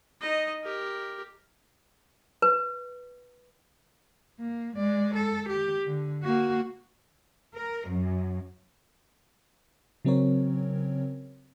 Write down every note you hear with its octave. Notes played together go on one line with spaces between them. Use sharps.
D#4 D#5
G4 A#4
B4
A#3
G#3 D5
A4
G4
D3
A#3 F#4
A#4
F#2
C#3 F#3 C4 C#4 A#4 C#5